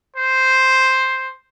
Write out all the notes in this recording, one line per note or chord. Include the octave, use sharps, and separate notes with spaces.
C5